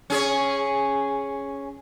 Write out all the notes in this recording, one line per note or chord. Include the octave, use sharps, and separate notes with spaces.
C#4 G#4 C#5